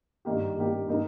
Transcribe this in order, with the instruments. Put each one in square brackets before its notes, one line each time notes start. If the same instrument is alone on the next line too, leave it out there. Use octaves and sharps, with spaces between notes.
[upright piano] G2 D#3 A#3 G4
G2 D#3 A#3 G4
D#3 A#3 D#4 A#4